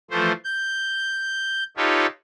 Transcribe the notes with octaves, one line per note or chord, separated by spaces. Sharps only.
E3 F3 A3 C5
G6
D#4 F4 G4 A4 B4 C#5